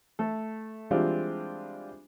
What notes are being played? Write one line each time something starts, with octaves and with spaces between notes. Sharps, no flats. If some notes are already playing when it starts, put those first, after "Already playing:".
A3 A4
E3 G3 G#3 C4 D4 F4